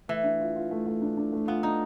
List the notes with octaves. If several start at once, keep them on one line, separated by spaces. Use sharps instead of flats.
E3 A3
D4
F4
F4
A3
A3
D4
D4
A3
B3 F4
D4 D#4